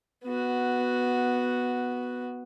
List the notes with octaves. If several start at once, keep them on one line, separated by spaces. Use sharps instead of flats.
B3 F#4